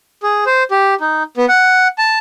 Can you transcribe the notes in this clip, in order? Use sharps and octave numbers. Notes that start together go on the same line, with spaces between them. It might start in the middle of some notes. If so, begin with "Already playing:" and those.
G#4
C5
G4
D#4
B3
F#5
A5